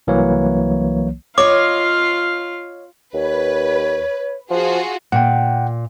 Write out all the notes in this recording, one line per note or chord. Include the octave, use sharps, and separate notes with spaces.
C2 E3 F#3 A#3 C#5
F4 C#5 D#5 F5 D6
D#2 B4 C#5
F3 F4 F#4 G#4
A#2 F#5 G5